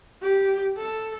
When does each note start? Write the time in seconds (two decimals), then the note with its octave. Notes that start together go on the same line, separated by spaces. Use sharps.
0.23 G4
0.77 A4